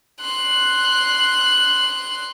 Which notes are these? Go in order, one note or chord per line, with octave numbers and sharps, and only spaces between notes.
C6 F#6